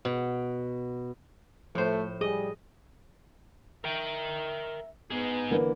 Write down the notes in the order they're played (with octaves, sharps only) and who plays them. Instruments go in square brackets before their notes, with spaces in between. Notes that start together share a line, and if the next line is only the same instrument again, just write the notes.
[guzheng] B2
[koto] A2 C5 [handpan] F3 [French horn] A3
[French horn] G3 [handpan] G#4 [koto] D#5
[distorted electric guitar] A#4 G5 [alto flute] E5
[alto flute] B3 [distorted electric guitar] D#4 G#4
[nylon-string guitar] D3 E3 A#3